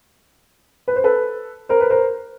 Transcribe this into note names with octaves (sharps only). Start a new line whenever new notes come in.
B4
C5
A4 B4
A#4 C5
B4
A#4 C5